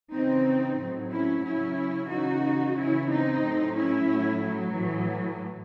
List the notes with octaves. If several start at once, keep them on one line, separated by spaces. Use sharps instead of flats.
C#3 E3 C4 D#4
A2 F#3
C#4 E4
C#3 F#3 C#4 E4
C#3 E3 D#4 F#4
C#3 E3 C#4 E4
C4 D#4
A2 F#3
C#4 E4
A2 F#3
F#3
A2 E3